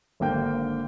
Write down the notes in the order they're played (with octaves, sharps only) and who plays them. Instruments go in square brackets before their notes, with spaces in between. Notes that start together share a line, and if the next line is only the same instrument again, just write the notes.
[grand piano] G#1 D3 A#3 G5 G6